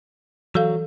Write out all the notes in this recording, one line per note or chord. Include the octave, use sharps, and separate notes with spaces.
E3 F#3 A4 F5